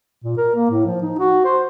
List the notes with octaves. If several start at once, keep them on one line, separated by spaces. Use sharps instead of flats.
A#2
A#4
A#3
A2
F3
D#4
F#4
C5